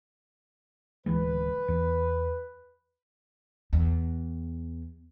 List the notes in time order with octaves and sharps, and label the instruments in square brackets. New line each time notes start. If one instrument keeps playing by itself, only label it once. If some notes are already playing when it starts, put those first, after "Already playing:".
[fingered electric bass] D1 E3 G#3 [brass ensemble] B4
[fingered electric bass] E2
[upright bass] E2